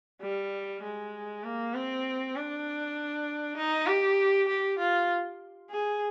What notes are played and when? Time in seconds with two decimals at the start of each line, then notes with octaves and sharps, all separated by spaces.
0.22 G3
0.83 G#3
1.44 A#3
1.75 C4
2.36 D4
3.57 D#4
3.88 G4
4.48 G4
4.79 F4
5.70 G#4